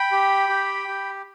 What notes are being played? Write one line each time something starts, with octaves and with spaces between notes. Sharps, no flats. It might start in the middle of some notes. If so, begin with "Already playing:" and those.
Already playing: G5 B5
G4
G4
G4